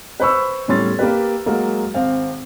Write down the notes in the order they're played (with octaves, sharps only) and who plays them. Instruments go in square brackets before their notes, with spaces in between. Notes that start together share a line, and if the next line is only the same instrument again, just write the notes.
[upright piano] B4 C5 B5 C#6 E6
E2 A2 G3 C#4 C6 A6
A#3 G4 B4
F#3 G#3 A#3
G#1 C4 F5